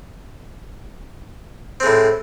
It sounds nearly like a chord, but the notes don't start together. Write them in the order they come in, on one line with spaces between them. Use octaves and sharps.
C4 G#3 A2